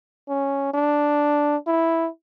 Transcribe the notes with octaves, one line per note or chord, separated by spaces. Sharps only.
C#4
D4
E4